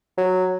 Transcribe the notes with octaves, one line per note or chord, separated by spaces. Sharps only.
F#3